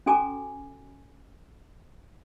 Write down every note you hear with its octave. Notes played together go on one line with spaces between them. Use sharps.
C#4 F#4 A4 G#5 A#5 D6